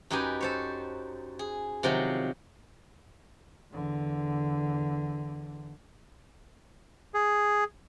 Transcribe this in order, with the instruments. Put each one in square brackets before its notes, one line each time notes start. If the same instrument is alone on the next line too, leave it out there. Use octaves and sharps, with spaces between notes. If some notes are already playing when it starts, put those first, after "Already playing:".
[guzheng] F#2 D#4 G4 B4 G#5
A4 C5 C#5
G#4
C3 D#3 F3 F#3
[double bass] E2 D3
[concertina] G#4